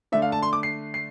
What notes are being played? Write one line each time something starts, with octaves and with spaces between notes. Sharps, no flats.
D3 A3 D4 E5
F5
A5
C6
D6
C7
C7